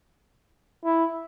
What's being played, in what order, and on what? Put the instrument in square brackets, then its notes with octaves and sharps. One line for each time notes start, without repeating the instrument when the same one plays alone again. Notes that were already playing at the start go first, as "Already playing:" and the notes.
[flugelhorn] E4